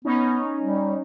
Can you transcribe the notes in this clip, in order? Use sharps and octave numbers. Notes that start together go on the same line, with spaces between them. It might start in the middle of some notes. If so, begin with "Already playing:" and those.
B3 C#4 D#4
G3